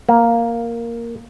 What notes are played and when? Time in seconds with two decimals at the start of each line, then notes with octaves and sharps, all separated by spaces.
0.09 A#3